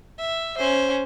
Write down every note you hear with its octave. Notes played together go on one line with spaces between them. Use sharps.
E5
C#4 C5